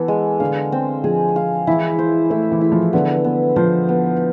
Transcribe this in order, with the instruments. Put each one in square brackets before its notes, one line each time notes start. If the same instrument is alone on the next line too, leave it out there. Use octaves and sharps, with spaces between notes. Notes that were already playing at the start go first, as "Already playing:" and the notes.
Already playing: [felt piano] E3 [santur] B3 A4
[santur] G#3
[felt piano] D3 [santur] F5
[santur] C4
[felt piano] F3 [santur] G#4
[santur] F5
[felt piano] E3 [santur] E4
[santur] C5
[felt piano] A3 [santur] E4
[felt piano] E3
[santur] E4
[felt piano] F3
[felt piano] D3 [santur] B3
[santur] B3
[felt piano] F3 [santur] C5
[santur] B3